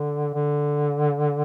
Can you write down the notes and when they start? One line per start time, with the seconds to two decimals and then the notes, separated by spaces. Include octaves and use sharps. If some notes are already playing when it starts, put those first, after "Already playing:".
Already playing: D3
0.34 D3